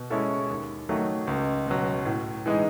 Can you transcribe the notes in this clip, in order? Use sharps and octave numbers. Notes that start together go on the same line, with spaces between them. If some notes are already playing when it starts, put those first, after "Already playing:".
Already playing: B2
G#3 C#4 E4 A4
D#2
D#3 F#3 A3
C#2
B2 F#3
A2
E3 G#3 D#4